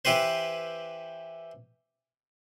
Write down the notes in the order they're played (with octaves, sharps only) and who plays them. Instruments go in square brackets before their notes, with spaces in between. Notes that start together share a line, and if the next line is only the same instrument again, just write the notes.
[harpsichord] E3 E4 G4 B4 C5